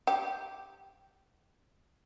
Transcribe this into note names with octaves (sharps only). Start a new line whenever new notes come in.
G4